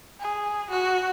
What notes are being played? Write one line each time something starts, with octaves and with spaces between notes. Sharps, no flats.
G#4
F#4